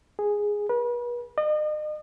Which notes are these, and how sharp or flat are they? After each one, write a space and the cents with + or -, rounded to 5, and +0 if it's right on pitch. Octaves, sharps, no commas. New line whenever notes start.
G#4 -5
B4 -40
D#5 -40